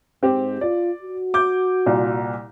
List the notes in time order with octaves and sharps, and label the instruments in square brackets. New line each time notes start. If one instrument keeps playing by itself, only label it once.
[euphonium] G#2 [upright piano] C4 G4
[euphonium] F4 [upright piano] D5
[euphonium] F#4
[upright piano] D6 G6
C2 A#2